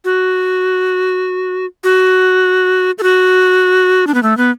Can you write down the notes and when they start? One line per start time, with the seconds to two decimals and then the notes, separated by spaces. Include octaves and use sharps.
0.05 F#4
1.84 F#4
2.98 A4
3.03 F#4
4.07 D4
4.14 B3
4.23 A3
4.37 B3